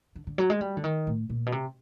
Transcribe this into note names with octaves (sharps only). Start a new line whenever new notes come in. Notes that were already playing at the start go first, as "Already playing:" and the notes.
D3
D3
F#3
G#3
G3
D3
D#3
A2
A#2
B2
C3